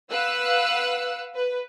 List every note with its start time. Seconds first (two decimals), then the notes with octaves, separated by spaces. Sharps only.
0.11 B4 F5 F#5 E6 F#6
1.35 B4